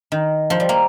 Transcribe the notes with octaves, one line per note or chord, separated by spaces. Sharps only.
D#3
F3
G3
A#3